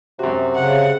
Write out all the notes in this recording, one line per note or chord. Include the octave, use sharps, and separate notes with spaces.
F#2 C3 F#4
C#3 F#5